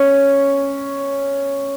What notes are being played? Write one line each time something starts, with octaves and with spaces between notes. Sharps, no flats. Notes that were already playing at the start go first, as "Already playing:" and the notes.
Already playing: C#4